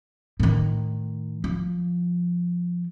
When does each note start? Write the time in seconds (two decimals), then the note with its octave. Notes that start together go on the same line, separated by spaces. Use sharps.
0.40 A2 D#3
1.44 F3